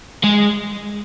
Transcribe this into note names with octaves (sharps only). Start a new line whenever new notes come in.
G#3